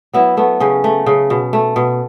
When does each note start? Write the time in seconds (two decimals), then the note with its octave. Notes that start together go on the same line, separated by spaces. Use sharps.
0.13 F#3 B3 E4
0.37 A3 B3
0.60 C#3 C#4
0.84 A3
1.06 C#3
1.30 B2
1.53 A3
1.76 B2